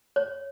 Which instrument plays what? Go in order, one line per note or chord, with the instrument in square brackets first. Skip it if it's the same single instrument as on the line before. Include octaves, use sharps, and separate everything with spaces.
[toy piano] C#5